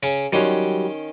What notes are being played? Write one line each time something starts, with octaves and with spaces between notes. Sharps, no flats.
C#3 C#4 C#6
D#3 F#3 G3 C#4 C6